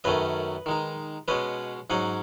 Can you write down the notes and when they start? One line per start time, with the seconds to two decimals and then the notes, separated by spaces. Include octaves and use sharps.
0.04 F#2 D#3 A3 C#4 B4 D#5
0.66 D#3 G#3 D#4
1.28 B2 G#3 C#4 B4 D#5
1.90 G#2 F#3 C#4 D#5 F#5